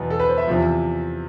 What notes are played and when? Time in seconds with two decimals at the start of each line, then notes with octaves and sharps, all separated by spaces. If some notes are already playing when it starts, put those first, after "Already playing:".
Already playing: E2 B2 B3
0.10 A4
0.19 B4
0.28 C5
0.38 E5
0.47 E2 C3 F3